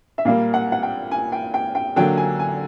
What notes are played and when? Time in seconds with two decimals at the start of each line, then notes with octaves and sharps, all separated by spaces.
0.18 E5
0.25 A#2 G3 A#3 F5
0.54 F#5
0.72 F#5
0.83 G5
1.11 G#5
1.32 G5
1.54 G5
1.75 G5
1.96 D3 F#3 A#3 G5
2.17 G#5
2.39 G#5